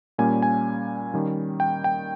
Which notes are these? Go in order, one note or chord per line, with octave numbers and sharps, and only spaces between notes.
A#2 G3 A#3 C#4 G#5
G#5
D#3 G3 C#4
G5
G5